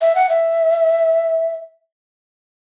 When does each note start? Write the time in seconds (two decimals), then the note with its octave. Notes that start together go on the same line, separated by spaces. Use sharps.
0.01 E5
0.15 F#5
0.29 E5